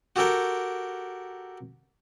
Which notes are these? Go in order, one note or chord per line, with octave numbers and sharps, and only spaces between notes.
F#4 G4 A4 A#4 G5